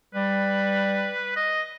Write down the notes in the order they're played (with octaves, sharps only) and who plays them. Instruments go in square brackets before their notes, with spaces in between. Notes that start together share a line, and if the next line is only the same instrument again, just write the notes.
[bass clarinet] G3 [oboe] B4
[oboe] D#5